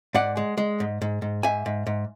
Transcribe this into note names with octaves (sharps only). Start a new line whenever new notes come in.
G#2 D5 F#5
G#3
G#3
G#2
G#2
G#2
G#2 E5 G#5
G#2
G#2